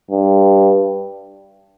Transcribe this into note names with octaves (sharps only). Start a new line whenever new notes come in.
G2